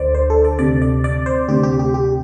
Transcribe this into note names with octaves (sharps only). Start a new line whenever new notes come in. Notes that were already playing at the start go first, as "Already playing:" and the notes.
Already playing: D2 D3 C5 D5
C5
A4
D5
D2 C3 D5
D5
D5
C5
D2 C3 G4
G4
G4
G4